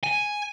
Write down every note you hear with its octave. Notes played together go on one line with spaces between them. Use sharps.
G#5